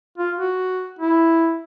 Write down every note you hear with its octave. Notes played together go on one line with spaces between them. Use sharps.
F4
F#4
E4